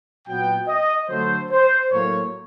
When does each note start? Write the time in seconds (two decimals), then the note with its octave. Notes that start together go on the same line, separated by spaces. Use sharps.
0.27 A#2 F#3 B3 G5
0.68 D#5
1.09 D3 F#3 A3 C5
1.52 C5
1.92 A2 F#3 A#3 C#5